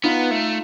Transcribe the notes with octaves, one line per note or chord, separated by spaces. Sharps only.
B3 D#4 F4
A3